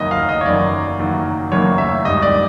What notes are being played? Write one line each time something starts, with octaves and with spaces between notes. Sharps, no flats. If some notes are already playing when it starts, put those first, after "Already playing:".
Already playing: F#1 F#2 D#3 F#3 A#3 D#5
F5
D#5
C#5
F#1 F#2 D#3 F#3 A#3 D5
F#1 F#2 D#3 F#3 A#3
F#1 F#2 D#3 F#3 A#3 C#5
E5
G#1 G2 D#3 D#5
D5